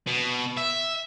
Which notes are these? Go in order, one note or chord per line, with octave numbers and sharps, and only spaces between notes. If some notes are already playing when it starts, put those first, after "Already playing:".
B2
E5